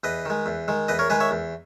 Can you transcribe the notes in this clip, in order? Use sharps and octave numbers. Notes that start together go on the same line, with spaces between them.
E2 B4 D#5
D#3 G#3
E2
D#3 G#3
E2 B4 D#5
A#4 C#5
D#3 G#3 G#4 B4
C#5 E5
E2